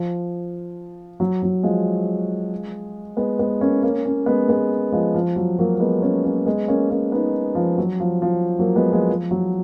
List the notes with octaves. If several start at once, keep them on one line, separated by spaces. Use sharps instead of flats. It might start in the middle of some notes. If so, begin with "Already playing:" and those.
Already playing: F3
F#3
F#3
F3 G#3
G#3 B3
G#3 B3
A#3 C#4
A#3 C#4
A#3 C#4
G#3 B3
G#3 B3
F3 G#3
F3
F#3
F#3 A#3
A#3
G#3 B3
A#3 C#4
A#3 C#4
G#3 B3
A#3 C#4
A#3 C#4
B3 D#4
F3
F#3
F3
F3
F#3 A#3
G#3 B3
F3 G#3
F3
F#3